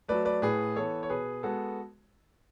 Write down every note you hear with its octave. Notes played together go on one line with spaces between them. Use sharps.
F#3 A3 B4 D5
B4 D5
A2 G#4 B4
E3 B3 A4 C#5
C#5
B2 G#4 B4
G#3 B3 F#4 A4